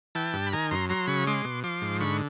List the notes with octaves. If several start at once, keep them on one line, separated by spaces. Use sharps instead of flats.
E3 G5 A5
G2
B5
D#3 G#5 A#5
F#2 A#5 C6
F#3 A#5 C6
C#3 B5 C#6
G#3 C6 D6
B2
F3 C6 D6
G#2
D3 B5 C#6